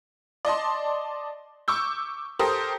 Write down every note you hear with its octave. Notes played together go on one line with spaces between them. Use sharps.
D5 D#5 A5 C6
C#6 D6 E6 G6
G4 A4 A#4 C5 D#6